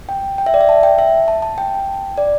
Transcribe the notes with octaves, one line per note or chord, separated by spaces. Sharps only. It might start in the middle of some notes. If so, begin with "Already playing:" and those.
G5
G5
E5
D5
E5
A5
G5
E5
A5
A5
G5
D5